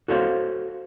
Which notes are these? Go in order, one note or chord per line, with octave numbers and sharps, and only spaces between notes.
F#4 A4 C5 C#5 F5